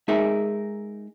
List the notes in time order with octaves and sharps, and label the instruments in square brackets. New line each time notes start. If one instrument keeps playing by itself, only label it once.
[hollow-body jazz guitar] G#3 D#4 G#4 A#4 E5